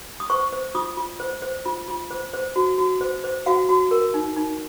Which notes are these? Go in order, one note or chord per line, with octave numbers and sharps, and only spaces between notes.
D#6
C5 C#6
C5
F4 D#6
F4
C5
C5
F4
F4
C5
C5
F#4
F#4
C5
C5
F#4 F5
F#4
A#4
D#4
D#4